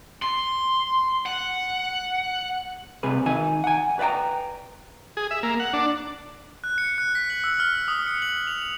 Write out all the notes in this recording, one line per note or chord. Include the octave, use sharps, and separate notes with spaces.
C6
F#5
C2 C3 G#4 B4
D#3 D#4 G#5
F#5 G#5
B4 D5 F5 G5 A#5
G#4
E5
A#3
F#5
D4
F#6
C#7
F#6
B6
F#7
E6
F6
D#6
C#7
F#7
F7
F7